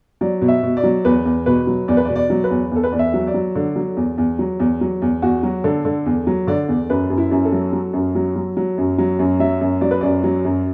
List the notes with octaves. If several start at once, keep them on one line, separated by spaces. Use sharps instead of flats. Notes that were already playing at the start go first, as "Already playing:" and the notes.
F#3 D5
B2
E5
B2
D5
F#3
E2 B4
E2
B2 B4
F#3
E2 D5
B4
D5
B2
D5
F#3
B4
E2
E2 A4
B4
E2 D5
E5
F#3
D5
F#3
D3
F#3
E2
E2
F#3
E2
F#3
E2
E2 F#4
F#3
D3 A4
D3
E2
F#3
D3 D5
E2
F#2 B4
F#2
E4
F#2
A4
F#3
F#3
F#2
F#3
F#3
F#3
F#2
F#3
F#2
F#3 E5
F#2
F#3 D5
B4
F#2 D5
F#3
F#2